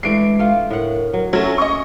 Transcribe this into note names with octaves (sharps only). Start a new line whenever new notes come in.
E3 G#3 A3 D4 C7 D7
A3 F4
A2 A#4 F#5
F#3
F#3 A3 C#4 A#4 E5
C#4 D#5 C#6